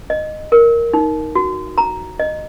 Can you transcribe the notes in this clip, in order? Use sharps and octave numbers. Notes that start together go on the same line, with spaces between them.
D#5
A#4
D#4
F#4
A#5
D#5